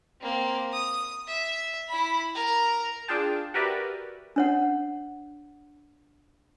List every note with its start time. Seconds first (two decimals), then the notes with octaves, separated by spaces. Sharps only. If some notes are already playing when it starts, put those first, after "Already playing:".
0.21 A#3 C4
0.72 D#6
1.27 E5
1.88 E4 B5
2.34 A#4 A#5
3.08 D4 F4 G#4 G5 A5
3.54 F#4 G4 A#4 B4 D5 E5
4.36 D4 C#5 F#5